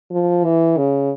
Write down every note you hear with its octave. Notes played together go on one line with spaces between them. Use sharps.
F3
E3
C#3